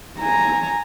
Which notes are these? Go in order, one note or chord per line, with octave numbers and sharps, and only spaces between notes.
G#5 A#5